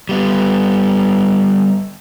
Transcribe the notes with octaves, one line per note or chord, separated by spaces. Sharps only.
G3 B3